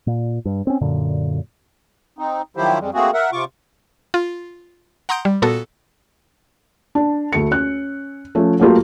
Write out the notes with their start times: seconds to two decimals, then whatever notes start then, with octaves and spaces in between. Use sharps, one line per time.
0.07 A#2
0.45 G2
0.67 C4 C#4
0.81 F#2 A#2 D3
2.18 C4 D#4
2.57 D#3 F3 F#3 E4 G4 C5
2.80 F2 G3 G#3
2.94 A3 A#3 C4 F#4 G#4
3.14 A#4 E5 F#5
3.32 C3 F4 C#6 D6
4.14 F4
5.09 F#5 A#5 C6 D#6 G6 D7
5.25 G3
5.42 A#2 B3 F#4 A4
6.95 D4
7.33 D2 A3 C#7
7.51 C#4 F#6
8.35 F3 A3 C#4
8.60 F#3 A3 A#3 F4 G4